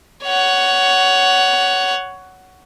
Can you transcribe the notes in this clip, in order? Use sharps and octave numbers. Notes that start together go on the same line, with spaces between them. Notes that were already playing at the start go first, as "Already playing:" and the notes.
C#5 F#5